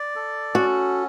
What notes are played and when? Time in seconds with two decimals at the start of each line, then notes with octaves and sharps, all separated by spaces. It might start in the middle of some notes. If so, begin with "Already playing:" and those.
Already playing: D5
0.16 A4
0.55 C#4 F#4